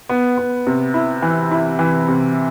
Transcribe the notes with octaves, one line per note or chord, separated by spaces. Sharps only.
B3
B3
C3
E4
E3
E4
E3
C3